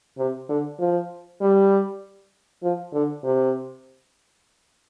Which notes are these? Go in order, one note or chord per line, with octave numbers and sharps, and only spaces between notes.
C3
D3
F3
G3
F3
D3
C3